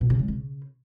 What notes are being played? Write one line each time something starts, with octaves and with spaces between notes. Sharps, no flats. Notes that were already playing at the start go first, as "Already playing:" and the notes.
B2
C#3
G#3
C#3